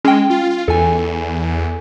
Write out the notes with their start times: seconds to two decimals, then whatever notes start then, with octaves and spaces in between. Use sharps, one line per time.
0.05 G#3 C#4 G5
0.30 F4
0.68 E2 A4 G#5